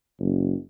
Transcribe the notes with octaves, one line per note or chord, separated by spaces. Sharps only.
F#1